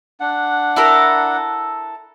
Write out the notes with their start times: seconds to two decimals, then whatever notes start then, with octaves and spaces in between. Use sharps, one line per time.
0.20 D4 F#5
0.76 E4 A4 A#4